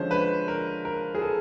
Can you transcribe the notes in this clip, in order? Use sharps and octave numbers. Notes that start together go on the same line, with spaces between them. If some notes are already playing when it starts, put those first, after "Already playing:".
Already playing: D3 F3 G#3 C#4 C5
B4
A#4
A#4
G#4
A4